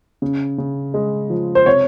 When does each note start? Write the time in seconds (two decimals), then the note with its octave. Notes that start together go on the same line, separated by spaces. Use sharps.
0.22 C#3
0.58 C#3
0.94 G#3
1.30 F3
1.55 C5
1.66 C3 C#5